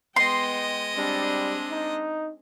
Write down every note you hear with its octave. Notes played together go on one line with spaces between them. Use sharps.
G#3 B3 D#5 G5 C6
G3 C4 D4
D#4